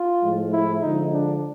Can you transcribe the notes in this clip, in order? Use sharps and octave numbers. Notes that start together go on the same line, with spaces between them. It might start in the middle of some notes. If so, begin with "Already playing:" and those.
Already playing: F4
A2 F3 G#3
E4
D3 F3 G#3 D#4
D4